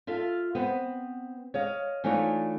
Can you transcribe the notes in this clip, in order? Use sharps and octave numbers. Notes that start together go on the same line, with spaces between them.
F4 A4 E5 F5
B3 C4 B4
C#5 D#5 F5
E3 A3 D4 D#4 F4 C#5